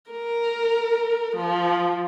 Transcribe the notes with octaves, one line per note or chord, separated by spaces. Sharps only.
A#4
F3